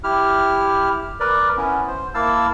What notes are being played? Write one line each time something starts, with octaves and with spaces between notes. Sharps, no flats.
E4 G4 F6
A#4 B4 D5
B3 C#4 E4
C5
A#3 E4 F5 A5 E6